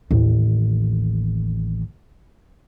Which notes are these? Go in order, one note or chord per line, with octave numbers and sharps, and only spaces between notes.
A1 D#2